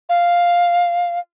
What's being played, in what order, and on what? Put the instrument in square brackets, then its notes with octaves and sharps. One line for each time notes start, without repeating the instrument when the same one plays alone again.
[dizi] F5